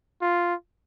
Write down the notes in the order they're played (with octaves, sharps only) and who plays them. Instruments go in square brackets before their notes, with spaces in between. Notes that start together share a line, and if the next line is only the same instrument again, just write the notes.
[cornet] F4